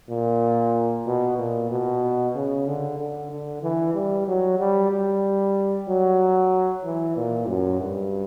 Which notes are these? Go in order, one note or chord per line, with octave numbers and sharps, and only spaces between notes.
A#2
B2
A#2
B2
C#3
D3
D3
D3
E3
G3
F#3
G3
G3
F#3
E3
A#2
F#2
G2